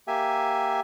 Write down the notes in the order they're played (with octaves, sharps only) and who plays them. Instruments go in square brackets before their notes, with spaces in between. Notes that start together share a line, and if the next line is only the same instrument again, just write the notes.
[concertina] A#3 G4 E5 G#5